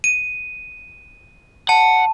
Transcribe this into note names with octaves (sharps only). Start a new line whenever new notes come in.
D#7
F#5 A5